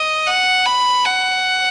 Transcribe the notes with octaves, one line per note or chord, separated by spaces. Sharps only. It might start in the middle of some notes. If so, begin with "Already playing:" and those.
Already playing: D#5
F#5
B5
F#5